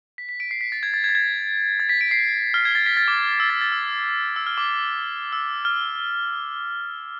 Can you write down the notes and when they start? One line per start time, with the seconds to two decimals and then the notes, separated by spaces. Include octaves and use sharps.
0.18 B6
0.29 B6
0.40 B6 D7
0.51 C7
0.61 B6
0.72 A6
0.83 G#6
0.94 A6
1.04 G#6
1.09 A6
1.15 G#6
1.80 A6
1.89 B6
2.01 B6 D7
2.11 C7
2.54 F6
2.65 G#6
2.75 A6
2.86 B6
2.97 A6
3.08 D6
3.40 E6
3.50 A6
3.61 A6
3.72 E6
4.36 E6
4.46 F6
4.57 D6
5.33 E6
5.65 F6